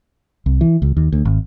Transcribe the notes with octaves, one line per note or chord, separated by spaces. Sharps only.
C2
E3
C#2
D#2
D2
G#1